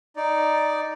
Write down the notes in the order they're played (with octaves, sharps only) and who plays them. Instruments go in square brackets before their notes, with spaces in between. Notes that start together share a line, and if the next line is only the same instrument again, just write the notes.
[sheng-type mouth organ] D#4 D5